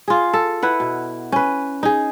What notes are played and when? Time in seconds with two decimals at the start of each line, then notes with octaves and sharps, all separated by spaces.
0.08 F4 G#4
0.33 A4
0.62 E4 B4 F#5
0.80 B2
1.32 C#4 B4
1.83 D#4 G#4